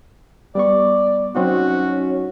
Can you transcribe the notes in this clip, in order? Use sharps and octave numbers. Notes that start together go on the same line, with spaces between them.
G3 B3 D5 C#6
F#3 C4 C#4 D#4 F#4